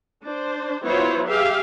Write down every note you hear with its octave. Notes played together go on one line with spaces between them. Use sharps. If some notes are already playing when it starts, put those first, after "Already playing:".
D4 C5
F#3 B3 E4 F4 C5 C#5
G4 G#4 E5 F5